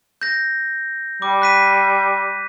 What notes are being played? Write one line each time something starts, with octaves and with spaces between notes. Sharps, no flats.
G6 A#6
G3 D6
F#6 B6 D#7